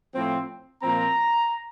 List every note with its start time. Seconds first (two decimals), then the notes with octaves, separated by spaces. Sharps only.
0.13 A2 F3 C4
0.82 A#2 F3 C4 A#5